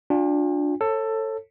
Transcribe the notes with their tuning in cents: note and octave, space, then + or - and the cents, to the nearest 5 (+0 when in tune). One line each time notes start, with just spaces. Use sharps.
D4 +0 F4 +40 G5 +45
A4 +15 C#5 -35